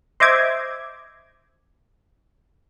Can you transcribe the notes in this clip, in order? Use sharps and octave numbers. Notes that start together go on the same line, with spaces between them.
C5 D#5 E5 D6 G#6